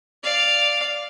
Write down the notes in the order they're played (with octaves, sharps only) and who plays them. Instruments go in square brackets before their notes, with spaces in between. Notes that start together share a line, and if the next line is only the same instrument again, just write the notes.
[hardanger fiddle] D5 F5